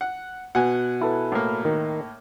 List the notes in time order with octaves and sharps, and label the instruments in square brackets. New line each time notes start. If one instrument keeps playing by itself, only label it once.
[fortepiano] F#5
[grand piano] B2 [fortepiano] F#5 G#5
[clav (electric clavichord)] E4 A4 B4
[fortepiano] A2 A#3
[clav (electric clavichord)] D#3